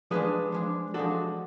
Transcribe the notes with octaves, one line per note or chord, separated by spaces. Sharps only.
F3 G#3 D4 G#4 B4
F3 G#3 D4
F3 G#3 D4 F#4 A4